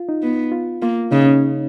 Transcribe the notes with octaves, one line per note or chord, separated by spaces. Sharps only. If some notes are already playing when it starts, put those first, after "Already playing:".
Already playing: F4
D#4
B3
F4
A#3 F4
C#3 D#4
C#4